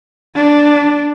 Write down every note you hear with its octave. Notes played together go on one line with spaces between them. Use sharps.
D4